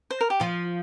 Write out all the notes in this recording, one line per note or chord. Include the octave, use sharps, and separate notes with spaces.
C5
A#4
G4
F3 F4